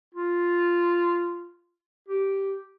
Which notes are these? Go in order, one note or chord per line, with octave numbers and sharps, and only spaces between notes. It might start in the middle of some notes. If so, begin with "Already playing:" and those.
F4
G4